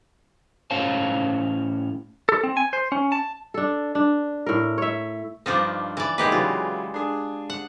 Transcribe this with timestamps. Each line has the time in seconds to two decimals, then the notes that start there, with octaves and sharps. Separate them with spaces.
0.71 A2 C#4 C5 C#5 F5 A5
2.29 A4
2.44 C4
2.57 G#5
2.73 C5
2.92 C#4
3.12 A5
3.54 D4 A4
3.95 D4
4.46 A2 A#4
4.78 C#5 E5
5.46 G2 F3 D4 D#4 F5 D6
5.97 E3 D5
6.18 G#3 A#3 B3 D#4 G4 B4
6.32 C#3 E3 F#3 F4
6.94 D4 G#4
7.50 F#5